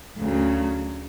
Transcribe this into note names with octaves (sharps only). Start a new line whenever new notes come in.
D2 C#3 F#3